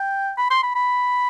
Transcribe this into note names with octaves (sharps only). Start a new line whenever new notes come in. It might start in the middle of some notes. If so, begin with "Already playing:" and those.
Already playing: G5
B5
C6
B5
B5